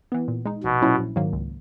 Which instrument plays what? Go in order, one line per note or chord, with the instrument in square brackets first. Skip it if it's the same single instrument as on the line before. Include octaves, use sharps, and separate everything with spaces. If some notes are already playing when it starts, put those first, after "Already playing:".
[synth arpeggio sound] E3 B3
A#2
G#3 D#4
[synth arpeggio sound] A#1 [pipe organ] B2
[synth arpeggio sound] A#2 F#3 C#4 E4
A#1
G#2 D#3 F#3 A#3
C#2